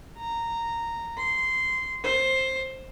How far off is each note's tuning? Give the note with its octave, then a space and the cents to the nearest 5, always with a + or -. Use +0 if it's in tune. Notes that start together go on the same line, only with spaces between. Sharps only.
A#5 -10
C6 -10
C5 +10